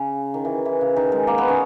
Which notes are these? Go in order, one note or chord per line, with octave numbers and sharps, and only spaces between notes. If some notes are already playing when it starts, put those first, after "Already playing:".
Already playing: C#3
D#3
E3
E3
C#3
D#3
G#3
A#3
B3
C#4